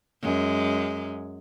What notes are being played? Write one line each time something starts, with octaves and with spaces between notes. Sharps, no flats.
F#2 G#3